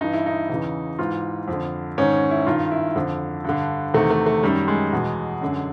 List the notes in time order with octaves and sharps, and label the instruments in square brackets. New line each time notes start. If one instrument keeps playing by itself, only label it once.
[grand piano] G2 E3 D#4
E4
D#4
E2 C#3 E3
G#2 E3 F4
F2
D3
G#2 D#3 C#4
E4
G2 D#3 F4
E4
F2 D3
G2 D3
E2 C3 D#3 A3
A3
A3
F#2 D#3 G3
G#3
E2 B2
F#2 D3